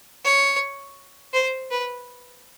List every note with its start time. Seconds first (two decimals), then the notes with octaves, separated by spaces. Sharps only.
0.24 C#5
1.34 C5
1.71 B4